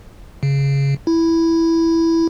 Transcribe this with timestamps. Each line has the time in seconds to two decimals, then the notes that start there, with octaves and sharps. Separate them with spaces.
0.43 C#3
1.07 E4